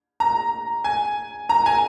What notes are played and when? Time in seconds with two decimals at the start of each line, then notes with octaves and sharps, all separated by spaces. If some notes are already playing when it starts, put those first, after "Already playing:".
0.20 A#5
0.84 G#5
1.49 A#5
1.66 G#5